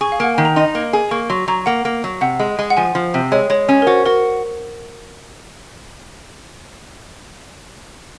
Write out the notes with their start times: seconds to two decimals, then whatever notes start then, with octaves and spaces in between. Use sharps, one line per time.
0.01 G#4 C#6
0.12 F5
0.20 A#3 F#5
0.34 D#3 G#5
0.45 A#5
0.56 D#4 C6
0.75 A#3
0.93 G#4
1.11 A#3 C#6
1.30 F#3 C6
1.48 F#3 A#5
1.66 A#3 F#5
1.85 A#3
2.04 F#3
2.21 C3 F#5
2.40 G#3
2.59 G#3
2.70 F#5
2.77 F3 G#5
2.95 F3
3.14 C3
3.32 G#3 C#5
3.50 G#3 C#5
3.69 C#4
3.82 A#4
3.87 F#4 C5
4.05 F#4 A#4